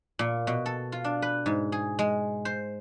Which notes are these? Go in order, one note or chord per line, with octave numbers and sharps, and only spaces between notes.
A#2
B2
A4
F4
D4
B4
G#2
G#4
G#3
C5